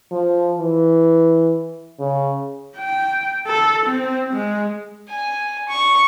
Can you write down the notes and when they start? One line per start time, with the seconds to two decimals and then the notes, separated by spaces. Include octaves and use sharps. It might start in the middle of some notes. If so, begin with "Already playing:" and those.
0.12 F3
0.58 E3
1.99 C#3
2.77 G5
3.47 A4
3.86 C4
4.33 G#3
5.09 G#5
5.68 C#6